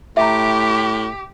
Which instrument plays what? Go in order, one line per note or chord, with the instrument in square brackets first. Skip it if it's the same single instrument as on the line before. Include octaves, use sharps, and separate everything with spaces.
[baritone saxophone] A2 [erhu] G4 [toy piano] E5 A#5